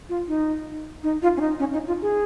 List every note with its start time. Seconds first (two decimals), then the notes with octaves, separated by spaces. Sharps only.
0.09 F4
0.28 D#4
1.03 D#4
1.22 F4
1.37 C#4
1.41 D#4
1.59 C#4
1.73 D#4
1.87 F4
2.02 G#4